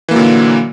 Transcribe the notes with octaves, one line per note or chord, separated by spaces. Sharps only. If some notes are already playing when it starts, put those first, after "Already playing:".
A#2 D3 E3 F#3 A#3